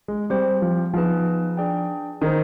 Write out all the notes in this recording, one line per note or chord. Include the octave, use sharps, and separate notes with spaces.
G#3
G3 C4 G4 C5
F3
F3 B3 D#4 G#4 B4
D4 G#4 D5 G5
D#3 D#4 G#4 C5